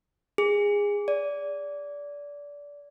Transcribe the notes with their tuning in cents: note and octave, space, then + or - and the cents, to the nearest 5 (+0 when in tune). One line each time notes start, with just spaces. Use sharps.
G#4 -20
D5 -25